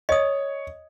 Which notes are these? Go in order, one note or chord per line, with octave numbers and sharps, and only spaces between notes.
C#5 D#5 D#6